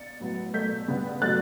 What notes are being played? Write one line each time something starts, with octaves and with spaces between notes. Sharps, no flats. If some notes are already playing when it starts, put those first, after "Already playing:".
Already playing: A6 C#7
A2 F#3 B3
B2 F#3 A3 G6 B6
C#3 G3 B3
B2 F#3 A3 F#6 A6